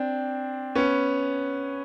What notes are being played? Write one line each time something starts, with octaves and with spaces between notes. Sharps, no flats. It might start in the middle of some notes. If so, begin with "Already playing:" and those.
Already playing: C4 D4
B3 C#4